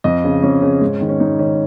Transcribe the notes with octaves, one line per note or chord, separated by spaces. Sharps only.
F2 D#5
C#3
F2 C#4
C#3
G#2
D#3
C#4
G#2 D#4
D#3 C#4